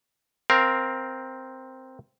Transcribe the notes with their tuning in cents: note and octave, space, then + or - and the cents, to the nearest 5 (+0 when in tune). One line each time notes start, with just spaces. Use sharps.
C4 +0 A#4 +15 F5 +0